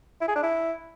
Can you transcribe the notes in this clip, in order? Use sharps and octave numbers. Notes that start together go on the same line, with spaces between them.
E4
G#4
D4
E4